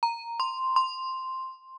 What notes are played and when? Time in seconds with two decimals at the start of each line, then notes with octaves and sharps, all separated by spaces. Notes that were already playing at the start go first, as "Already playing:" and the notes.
0.03 A#5
0.40 C6
0.76 C6